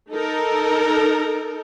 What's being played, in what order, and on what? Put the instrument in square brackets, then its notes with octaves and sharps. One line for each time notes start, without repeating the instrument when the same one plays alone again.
[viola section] D#4 A4 A#4